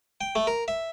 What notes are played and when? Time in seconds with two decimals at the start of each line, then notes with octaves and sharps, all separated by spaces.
0.21 G5
0.36 A3
0.47 A#4
0.68 E5